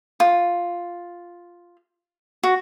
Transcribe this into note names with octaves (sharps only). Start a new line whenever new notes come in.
F4
F#4